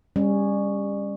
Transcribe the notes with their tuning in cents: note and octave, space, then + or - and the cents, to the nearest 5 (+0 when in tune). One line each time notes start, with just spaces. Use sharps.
G3 +30 C#4 +0